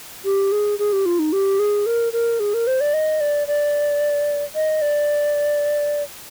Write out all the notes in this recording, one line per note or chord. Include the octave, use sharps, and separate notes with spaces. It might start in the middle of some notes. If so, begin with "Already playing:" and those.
G4
G#4
G#4
G4
F4
D#4
G4
G#4
A#4
A#4
G#4
A#4
C5
D5
D#5
D5
D5
D#5
D5